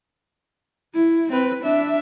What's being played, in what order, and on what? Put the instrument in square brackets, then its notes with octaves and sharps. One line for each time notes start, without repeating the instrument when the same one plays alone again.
[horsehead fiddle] E4
C4 B4
D4 E5